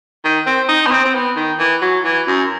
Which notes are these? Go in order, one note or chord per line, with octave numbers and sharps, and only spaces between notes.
D#3
C4
D#4
B3
C4
C4
B3
D#3
E3
F#3
E3
F#2